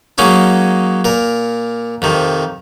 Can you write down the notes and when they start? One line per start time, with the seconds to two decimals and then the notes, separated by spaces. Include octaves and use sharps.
0.18 F#3 G#3 A#3 C#4 D#4
1.05 A#2 A#4
2.02 F2 C3 D#3